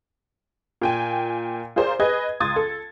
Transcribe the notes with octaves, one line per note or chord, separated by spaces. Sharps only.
A#2 G5 G#5
F4 G#4 A#4 C5 D5
G#4 B4 D#5 G#6
C#2 C6 D#6 G#6 A6
A4